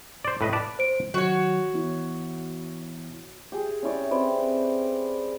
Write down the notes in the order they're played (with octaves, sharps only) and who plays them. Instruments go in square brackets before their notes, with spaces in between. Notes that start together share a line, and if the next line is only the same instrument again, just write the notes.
[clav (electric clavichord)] C5 D5
A2 B4 D#5
B4 D5 A5
[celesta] C5 D7
[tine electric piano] D#3 F#3 [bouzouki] F#4 C#5
[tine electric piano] E3 B3 E4
[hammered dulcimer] G4 G#4
C#4 E4 C#5 D5
C4 B4 D5